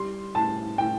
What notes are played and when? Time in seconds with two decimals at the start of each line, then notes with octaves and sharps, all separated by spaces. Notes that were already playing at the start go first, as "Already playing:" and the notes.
Already playing: G3 C6
0.35 A2 A5
0.78 A2 G5